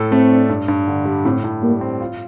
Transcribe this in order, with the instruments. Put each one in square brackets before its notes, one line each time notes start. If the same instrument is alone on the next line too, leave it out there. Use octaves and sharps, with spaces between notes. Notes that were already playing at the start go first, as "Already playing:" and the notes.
Already playing: [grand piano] A2 A4
[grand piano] A3 [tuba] C4
[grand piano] D4
G2
G2
D3
G3
[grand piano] A2 [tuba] C4
[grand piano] A2
[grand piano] G3 [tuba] A#3
[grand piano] C4
F4